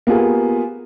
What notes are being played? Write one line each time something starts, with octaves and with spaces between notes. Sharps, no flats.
A#3 B3 F4 G4 G#4